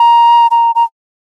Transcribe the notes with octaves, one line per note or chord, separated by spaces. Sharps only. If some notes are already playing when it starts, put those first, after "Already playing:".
Already playing: A#5
A#5
A#5